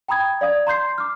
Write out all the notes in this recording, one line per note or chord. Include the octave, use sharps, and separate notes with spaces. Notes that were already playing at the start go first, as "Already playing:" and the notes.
G5 A#5 B5 D#6 G#6
D5 F5 D#6 G#6
A#5 C6 G6 C7
D6 F6